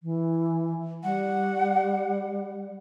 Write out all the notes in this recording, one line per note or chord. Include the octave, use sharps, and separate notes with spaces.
E3
G3 F#5